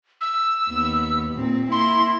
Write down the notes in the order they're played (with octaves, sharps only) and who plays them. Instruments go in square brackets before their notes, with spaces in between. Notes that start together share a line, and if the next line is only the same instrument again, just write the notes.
[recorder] E6
[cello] D#2 B3
A#2 C4
[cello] A#3 E4 [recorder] C6